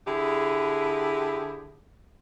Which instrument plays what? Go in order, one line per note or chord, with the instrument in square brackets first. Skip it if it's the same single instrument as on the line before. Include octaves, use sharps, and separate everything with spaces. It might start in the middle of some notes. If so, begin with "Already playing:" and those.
[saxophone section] D3 E4 G4 G#4